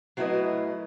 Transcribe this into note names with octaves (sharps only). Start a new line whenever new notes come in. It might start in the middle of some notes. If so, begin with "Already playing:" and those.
F#3 A3 E4 A#4 B4 D#5